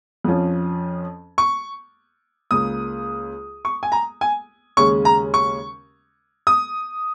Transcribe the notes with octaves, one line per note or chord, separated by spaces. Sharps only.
F2 F3 C#4
C#6
C#2 C#3 A#3 D#6
C#6
G#5
A#5
G#5
D#2 C#3 G#3 C#4 C#6
A#5
C#6
D#6